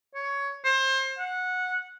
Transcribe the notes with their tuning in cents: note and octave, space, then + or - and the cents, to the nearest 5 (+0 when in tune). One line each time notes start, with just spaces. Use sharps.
C#5 +15
C5 +25
F#5 -15